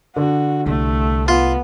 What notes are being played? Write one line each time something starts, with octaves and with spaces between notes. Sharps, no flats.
D3 F#4
C2 A3
B3 F4